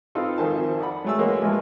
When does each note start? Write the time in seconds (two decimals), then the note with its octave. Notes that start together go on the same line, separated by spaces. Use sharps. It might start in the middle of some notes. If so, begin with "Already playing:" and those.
0.15 C4 D#4 F4 A4 B4
0.38 G#1 F2 D#3 C5 G#5 A5
0.80 D5 F#5 B5
1.04 F#3 G#3 A3 G#4 E6
1.19 E3 G#3 A#3 C#4 F#4
1.42 G#2 B2 E3 F3 G#3 A3